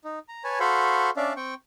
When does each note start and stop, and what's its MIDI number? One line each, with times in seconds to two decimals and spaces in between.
0.05 0.19 63
0.29 0.43 82
0.44 0.59 71
0.44 0.59 73
0.44 0.59 80
0.44 0.59 81
0.60 1.10 66
0.60 1.10 69
0.60 1.10 72
0.60 1.10 77
0.60 1.10 83
0.60 1.10 85
1.17 1.33 61
1.17 1.33 62
1.17 1.33 74
1.17 1.33 76
1.17 1.33 77
1.36 1.54 60
1.36 1.54 79
1.36 1.54 85